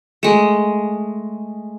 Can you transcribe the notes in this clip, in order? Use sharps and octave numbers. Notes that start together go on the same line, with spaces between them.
G#3 A3